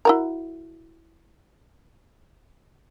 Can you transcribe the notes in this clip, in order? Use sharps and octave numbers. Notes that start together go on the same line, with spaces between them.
E4 F#4 A#4